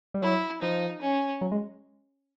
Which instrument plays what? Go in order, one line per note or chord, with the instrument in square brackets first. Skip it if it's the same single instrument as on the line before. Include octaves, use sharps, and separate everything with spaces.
[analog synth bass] G3
[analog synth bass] F#3 [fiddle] E4
[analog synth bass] F3 [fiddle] D#4
[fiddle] C#4
[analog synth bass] F#3
G#3